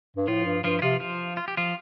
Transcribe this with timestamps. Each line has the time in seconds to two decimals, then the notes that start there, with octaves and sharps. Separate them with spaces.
0.17 G2
0.27 A2 F3 F4
0.45 G2
0.64 G2 F3 F4
0.79 E4
0.82 C3 F3 F4
1.00 F3 F4
1.37 F4
1.48 G4
1.57 F3 F4